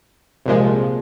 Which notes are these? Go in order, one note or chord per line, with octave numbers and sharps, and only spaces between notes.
C2 A#2 F3 G#3